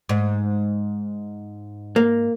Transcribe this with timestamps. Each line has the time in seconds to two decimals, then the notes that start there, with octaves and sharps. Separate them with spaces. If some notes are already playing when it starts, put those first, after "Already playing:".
0.09 G#2
1.96 A#3